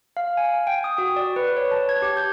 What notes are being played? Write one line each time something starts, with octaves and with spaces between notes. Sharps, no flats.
F5
G#5
G5
D#6
F#4
D5
B4
C#5
A5
G#6
G4
G6